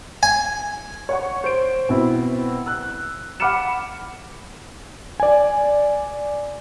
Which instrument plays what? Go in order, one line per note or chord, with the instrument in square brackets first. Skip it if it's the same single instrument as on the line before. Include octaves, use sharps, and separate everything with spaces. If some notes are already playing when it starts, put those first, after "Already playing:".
[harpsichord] G#5
[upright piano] C#5 F#5 C#6
C5 D7
B2 C4 E4
E6 F#6
F#5 B5 D6 F6 C#7 E7
[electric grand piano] D5 G#5